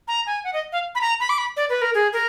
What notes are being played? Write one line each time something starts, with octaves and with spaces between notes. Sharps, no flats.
A#5
G#5
F#5
D#5
F5
B5
A#5
B5
D6
B5
D5
B4
A#4
G#4
A#4